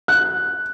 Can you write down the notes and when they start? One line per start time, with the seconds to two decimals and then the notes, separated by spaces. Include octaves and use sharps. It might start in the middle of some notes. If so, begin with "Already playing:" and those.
0.08 F#6